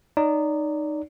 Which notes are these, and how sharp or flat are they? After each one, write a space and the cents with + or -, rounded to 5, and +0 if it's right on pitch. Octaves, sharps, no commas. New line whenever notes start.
D#4 -20 D5 -30